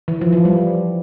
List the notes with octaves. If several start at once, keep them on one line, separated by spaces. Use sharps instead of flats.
E3
F3
F3
G3